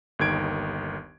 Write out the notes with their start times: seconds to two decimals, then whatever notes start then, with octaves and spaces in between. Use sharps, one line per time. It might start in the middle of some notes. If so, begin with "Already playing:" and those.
0.19 G1 D#2 D#3 G#6 D7